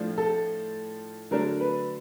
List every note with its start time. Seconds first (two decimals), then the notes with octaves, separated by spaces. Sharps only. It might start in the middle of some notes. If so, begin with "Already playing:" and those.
Already playing: A2 F3 A3 D4 F4
0.18 A4
1.31 D3 F#3 A3 D4 A#4
1.60 B4